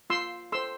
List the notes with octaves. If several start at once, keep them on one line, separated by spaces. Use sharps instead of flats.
F4 C6 E6
A4 C5 C6 E6